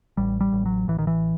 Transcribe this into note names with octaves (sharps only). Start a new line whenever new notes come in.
A1 G3
G3
A1
F#3
A1 E3
D#3
E3